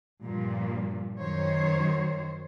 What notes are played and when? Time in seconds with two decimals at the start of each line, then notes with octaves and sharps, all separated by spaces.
0.24 G2 A#2 F3 G3
1.19 F#2 D#3 F#3 C5 C#5